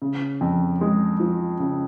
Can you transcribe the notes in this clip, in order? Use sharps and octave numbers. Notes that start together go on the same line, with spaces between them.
C#3
F2
G#3
F3
C#3